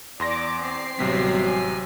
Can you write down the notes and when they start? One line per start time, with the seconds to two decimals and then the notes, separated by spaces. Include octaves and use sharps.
0.20 E2 D5 C6 D6 A#6
0.63 C4 C7
0.99 A1 C3 F#3 G3 B3 B6
1.47 G#5